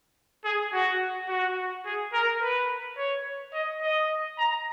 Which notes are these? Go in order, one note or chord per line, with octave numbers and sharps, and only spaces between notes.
G#4
F#4
F#4
G#4
A#4
B4
C#5
D#5
D#5
A#5